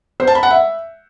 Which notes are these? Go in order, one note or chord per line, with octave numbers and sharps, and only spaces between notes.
C5
A5
B5
F#5
E5